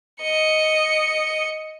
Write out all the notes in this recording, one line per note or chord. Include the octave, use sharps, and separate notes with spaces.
D#5 C#7